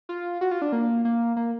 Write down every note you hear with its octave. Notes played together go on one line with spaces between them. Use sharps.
F4
F#4
F4
D4
A#3
A#3
A#3